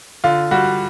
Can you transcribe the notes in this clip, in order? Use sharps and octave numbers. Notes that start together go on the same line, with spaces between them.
D3 F4
G3 F#4